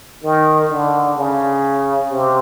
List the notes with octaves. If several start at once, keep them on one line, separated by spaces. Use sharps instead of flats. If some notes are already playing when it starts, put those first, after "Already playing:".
D#3
D3
C#3
C3